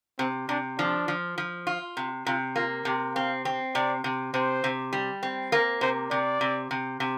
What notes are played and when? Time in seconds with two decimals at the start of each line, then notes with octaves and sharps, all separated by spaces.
0.19 C3 C4
0.49 C3 D4
0.78 F3 D4
1.08 F3
1.38 F3
1.67 F4
1.97 C3
2.26 C3 F4
2.56 A#3 F4
2.85 C3 G4
3.15 C4 F5
3.45 C4
3.75 C3 D5
4.04 C3
4.34 C3 C5
4.64 C3
4.93 G3
5.23 C4
5.52 A#3 A#4
5.81 C3 C5
6.11 C3 D5
6.41 C3
6.71 C3
7.00 C3